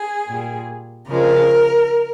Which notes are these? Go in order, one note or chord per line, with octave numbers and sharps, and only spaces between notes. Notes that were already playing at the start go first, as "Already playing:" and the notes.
Already playing: G#4
A#2 G3
C#3 F3 G#3 A#4